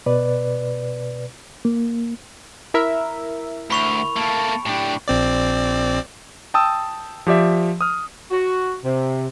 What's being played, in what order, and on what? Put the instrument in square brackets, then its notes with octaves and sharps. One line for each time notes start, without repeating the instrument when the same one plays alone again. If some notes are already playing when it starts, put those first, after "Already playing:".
[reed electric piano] B2 B4 D5
A#3
[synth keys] E4 A#4 E5
[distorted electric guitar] D2 [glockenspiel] B5 C#6 F7
[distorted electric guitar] A3 A#3 [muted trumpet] A5
[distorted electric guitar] A2 D4 [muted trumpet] G4
[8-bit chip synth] A#1 C4 D5
[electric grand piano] G5 A5 D#6 E6
F3 G4 D5 E5
D#6 F6
[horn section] F#4
C3